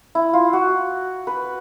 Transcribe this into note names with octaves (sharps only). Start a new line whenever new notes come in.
E4
F4
F#4
B4